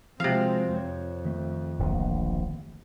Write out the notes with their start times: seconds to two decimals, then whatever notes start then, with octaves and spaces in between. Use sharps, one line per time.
0.20 C3 F3 G#3 C4 F#4 F5
0.75 F2 C5 C#5
1.25 D#3 A3
1.79 D1 A#1